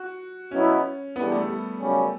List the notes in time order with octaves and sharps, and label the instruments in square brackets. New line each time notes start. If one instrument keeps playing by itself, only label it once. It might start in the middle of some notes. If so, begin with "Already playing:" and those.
Already playing: [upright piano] F#4
[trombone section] B2 F#3 B3 E4 [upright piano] C#4
[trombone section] E2 D3 G3 [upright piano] B3
[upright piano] A3
G3
[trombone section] F#2 C#3 G3 C#4